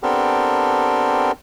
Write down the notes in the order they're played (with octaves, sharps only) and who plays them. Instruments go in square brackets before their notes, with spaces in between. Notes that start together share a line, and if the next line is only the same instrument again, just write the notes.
[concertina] B3 C4 D4 G4 A4 A#4